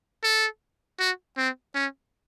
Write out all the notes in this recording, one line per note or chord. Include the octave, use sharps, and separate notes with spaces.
A4
F#4
C4
C#4